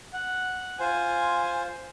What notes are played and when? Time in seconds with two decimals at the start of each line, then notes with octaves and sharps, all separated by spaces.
0.13 F#5
0.80 F4 C5 G#5